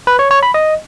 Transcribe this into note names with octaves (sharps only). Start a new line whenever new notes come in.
B4
C#5
C#5
B5
D#5